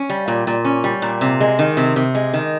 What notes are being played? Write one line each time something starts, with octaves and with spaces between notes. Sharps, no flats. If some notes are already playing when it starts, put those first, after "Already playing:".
Already playing: C#4
G3
A#2
A#2
C#4
G3
A#2
C3
G#3
D#3
C3
C3
G#3
D#3